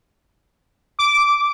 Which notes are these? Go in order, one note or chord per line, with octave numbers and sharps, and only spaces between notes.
D6